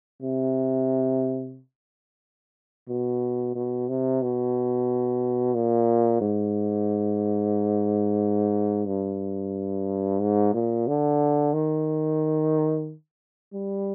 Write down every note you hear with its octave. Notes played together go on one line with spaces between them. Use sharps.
C3
B2
B2
C3
B2
A#2
G#2
G2
G#2
A#2
D3
D#3
G3